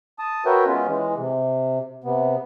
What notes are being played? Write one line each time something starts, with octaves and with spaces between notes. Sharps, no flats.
A5 D#6
F#4 A#4 B4 C#5 E5 G5
G#3 B3 C#4 F4
E3 G#3
C3
C3 B3